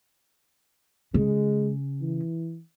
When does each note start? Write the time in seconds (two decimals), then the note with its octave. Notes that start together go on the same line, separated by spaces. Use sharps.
1.14 C#3 G#3
2.02 E3